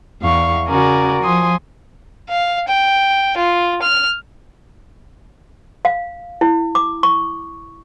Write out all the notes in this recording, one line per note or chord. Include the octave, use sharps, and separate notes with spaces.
E2 F5 C#6
C#3 F#4 A#4 D5 G#5 A#5
F3 G#5 C6 D#6
F5
G5
F4
F6
F5
E4
D6
C#6